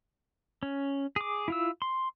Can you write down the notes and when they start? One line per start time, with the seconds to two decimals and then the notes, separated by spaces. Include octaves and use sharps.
0.63 C#4
1.16 G#4 D6
1.48 E4 F4 E6
1.82 C6